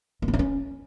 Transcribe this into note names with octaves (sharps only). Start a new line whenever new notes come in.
A#3
B3
D4
C#4